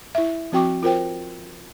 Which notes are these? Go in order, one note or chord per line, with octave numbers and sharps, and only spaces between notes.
E4 E5
F3 C4 F#4 G5 C#6 D6
F4 A#4 C5 G5